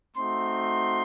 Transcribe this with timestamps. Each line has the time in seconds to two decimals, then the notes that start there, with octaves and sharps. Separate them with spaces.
0.16 A3 C4 D#4 F#4 C6